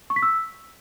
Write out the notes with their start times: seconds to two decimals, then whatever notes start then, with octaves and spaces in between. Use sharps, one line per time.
0.10 C#6
0.16 B6
0.22 E6